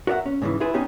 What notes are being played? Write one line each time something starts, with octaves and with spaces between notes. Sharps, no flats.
F#4 A#4 D5 E5 F#5
C#4
G#2 C#3 E3
E4 F4 G#4 B4
B3 C#4 D#4 G4 G#4